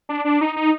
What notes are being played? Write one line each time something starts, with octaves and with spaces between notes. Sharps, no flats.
D4
D4
D#4
D#4